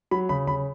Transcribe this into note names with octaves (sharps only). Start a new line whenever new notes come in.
F#3 B5
C#3 B5
C#3 B5